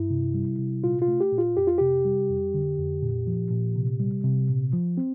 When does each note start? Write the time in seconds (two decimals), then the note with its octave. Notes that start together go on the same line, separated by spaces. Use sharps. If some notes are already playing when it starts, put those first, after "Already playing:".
Already playing: G2 E4
0.10 C3
0.34 G3
0.59 C3
0.83 A#2 F4
1.02 F4
1.08 A3
1.20 G4
1.32 A#2
1.38 F4
1.56 F2 G4
1.67 F4
1.78 C3 G4
2.05 G3
2.29 F2
2.54 D3
2.78 F2
3.03 A#2
3.27 F3
3.51 A#2
3.76 C3
4.00 G3
4.24 C3
4.49 A#2
4.73 F3
4.97 C4